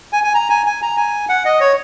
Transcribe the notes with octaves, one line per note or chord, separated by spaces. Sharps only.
G#5
G#5
A#5
G#5
G#5
A#5
G#5
F#5
D#5
C#5